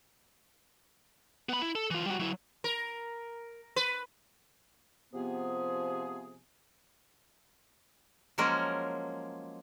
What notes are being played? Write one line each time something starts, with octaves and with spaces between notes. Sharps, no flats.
B3 B5
E4
A4
E3 F4
G3 F#4
F#3 E4
A#4
B4
C3 F3 B3 G#4
F3 F#3 G#3 A#3 C#4 A#4